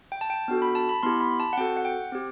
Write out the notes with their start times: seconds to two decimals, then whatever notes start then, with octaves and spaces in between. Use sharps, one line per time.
0.12 G5
0.21 A5
0.30 G5
0.48 B3 D4 F#4 A4
0.62 B5
0.75 A5
0.89 B5
1.03 B3 E4 G4 C6
1.21 B5
1.40 A5
1.53 F#5
1.57 C4 F#4 A4 G5
1.77 F#5
1.85 G5
2.12 C4 G4